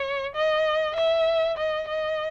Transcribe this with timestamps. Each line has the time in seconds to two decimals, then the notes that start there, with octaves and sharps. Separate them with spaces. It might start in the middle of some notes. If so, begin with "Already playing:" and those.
Already playing: C#5
0.35 D#5
0.96 E5
1.57 D#5
1.88 D#5